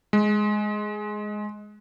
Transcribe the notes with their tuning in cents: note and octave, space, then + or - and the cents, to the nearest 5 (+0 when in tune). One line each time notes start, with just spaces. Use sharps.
G#3 +10